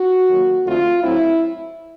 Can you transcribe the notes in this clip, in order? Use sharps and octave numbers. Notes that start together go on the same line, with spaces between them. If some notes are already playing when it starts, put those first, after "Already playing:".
Already playing: F#4
F#2 D#3 F#3 A#3
F2 D3 F3 A3 F4
A2 F#3 A3 C4 E4